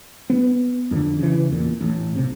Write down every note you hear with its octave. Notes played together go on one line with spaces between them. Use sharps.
B3
F2 D3
C#3 E3
E2 A#2
A1 A2
B1 C3